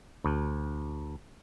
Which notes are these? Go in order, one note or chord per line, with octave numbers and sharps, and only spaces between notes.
D2